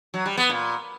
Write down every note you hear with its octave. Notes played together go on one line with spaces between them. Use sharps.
F#3
G3
B3
A#2